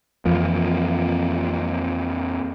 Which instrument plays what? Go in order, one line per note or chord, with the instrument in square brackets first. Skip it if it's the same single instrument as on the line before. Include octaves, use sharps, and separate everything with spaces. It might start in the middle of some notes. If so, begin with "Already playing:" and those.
[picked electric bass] F2 E3 F3 A#3